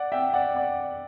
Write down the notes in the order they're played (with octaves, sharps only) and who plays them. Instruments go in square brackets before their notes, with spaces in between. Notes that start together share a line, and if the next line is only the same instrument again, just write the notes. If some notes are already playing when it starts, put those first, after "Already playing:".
Already playing: [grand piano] D5 F#5
E5 G5
D5 F#5
D5